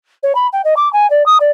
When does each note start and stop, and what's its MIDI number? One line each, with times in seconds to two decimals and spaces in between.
0.23 0.32 73
0.35 0.47 83
0.52 0.61 79
0.64 0.74 75
0.76 0.91 86
0.93 1.09 80
1.10 1.25 74
1.26 1.37 87
1.40 1.51 74